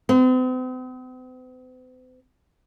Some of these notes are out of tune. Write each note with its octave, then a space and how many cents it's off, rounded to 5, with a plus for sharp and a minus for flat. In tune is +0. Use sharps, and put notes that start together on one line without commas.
C4 -45